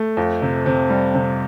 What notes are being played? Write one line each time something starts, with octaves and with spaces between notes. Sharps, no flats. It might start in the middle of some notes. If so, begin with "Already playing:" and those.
Already playing: A3
F2
C3
C3
G3
C3